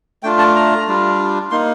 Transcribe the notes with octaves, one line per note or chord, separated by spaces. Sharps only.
A3 D4 F4 G5
A5
A#5
G3 D4 F4
A#3 D#4 C6